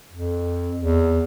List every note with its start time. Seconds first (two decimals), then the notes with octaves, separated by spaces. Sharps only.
0.12 F2
0.79 E2